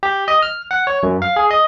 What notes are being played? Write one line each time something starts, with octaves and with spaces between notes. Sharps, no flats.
G4
D#5
F6
F#5
C#5
F#2
F5
G#4
D#5